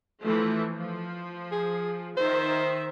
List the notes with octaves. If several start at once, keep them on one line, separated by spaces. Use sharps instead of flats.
E3 F3 A3
F3
G#4
D#3 C5 E5